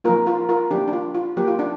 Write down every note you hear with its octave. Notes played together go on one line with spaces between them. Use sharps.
F3 A#3 F4 A#4
F4 A#4
F4 A#4
F3 A#3 D4 G4
D4
F4
F4
F3 A#3 G4
F4
D4